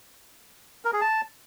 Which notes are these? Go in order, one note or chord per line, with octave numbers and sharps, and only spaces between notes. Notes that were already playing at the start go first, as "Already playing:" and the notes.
A#4
G#4
A5